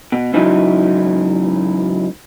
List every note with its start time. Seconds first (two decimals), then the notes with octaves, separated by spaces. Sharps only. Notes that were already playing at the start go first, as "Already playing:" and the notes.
0.12 B2
0.34 G#2 C#3 E3 F#3 D#4 E4